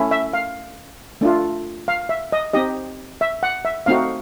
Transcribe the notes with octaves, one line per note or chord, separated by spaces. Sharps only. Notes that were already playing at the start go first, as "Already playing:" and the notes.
Already playing: A3 C#4 E4
E5
F5
A3 D4 F4
F5
E5
D#5
C4 D#4 G4 D#5
E5
F#5
E5
A3 C4 D#4 F#4 F5